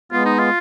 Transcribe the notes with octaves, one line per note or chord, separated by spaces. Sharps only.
G#3 B3 F4
D#4
F4